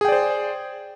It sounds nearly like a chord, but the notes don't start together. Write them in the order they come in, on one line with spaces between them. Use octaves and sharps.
G#4 G5 D5 C5